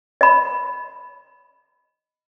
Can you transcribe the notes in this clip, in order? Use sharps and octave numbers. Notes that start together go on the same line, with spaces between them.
D#5 B5